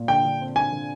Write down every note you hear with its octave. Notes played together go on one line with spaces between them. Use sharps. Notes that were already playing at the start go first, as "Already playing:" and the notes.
Already playing: A#2
D3 G5
D3
C4
D3 G#5
D3